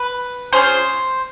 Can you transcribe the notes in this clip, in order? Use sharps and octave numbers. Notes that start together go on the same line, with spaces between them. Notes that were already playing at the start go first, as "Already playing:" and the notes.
Already playing: B4
C#4 F4 G#4 C5